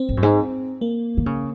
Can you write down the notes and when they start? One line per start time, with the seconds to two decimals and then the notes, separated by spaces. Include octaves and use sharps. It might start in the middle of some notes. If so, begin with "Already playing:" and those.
Already playing: C4
0.09 G#2
0.17 F#2
0.23 G#2
0.81 A#3
1.17 D#3
1.26 C#3